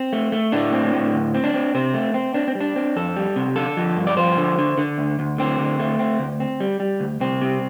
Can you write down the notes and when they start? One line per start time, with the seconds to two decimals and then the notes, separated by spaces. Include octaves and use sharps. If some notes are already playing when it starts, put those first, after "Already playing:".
Already playing: C4
0.13 A3
0.32 A3
0.52 A2 D4
0.73 C4
0.93 A2
1.14 D2
1.34 C4
1.44 D4
1.54 C4
1.75 C3 C4
1.94 A3
2.14 C4
2.34 C4 D4
2.48 C4
2.55 G3
2.61 D4
2.76 C4
2.96 F2 A4
3.17 G3
3.36 C3
3.56 D3 A4
3.77 F3
3.97 G2
4.07 D5
4.17 F3 C5
4.38 D3
4.58 D3
4.77 D3
4.98 D2
5.19 D2
5.38 D3 C4
5.59 D2
5.80 A3
5.99 C4
6.19 D2
6.40 C4
6.60 G3
6.80 G3
7.00 D2
7.20 C2 C4
7.42 C3